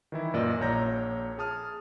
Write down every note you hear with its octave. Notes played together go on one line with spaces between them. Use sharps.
D#3 E3 E4
F#2 A#2 A#4 D5 D#5 E6
A#1 A#2 C#5 A#5 G6 A#6
G#4 A5 D#6 F6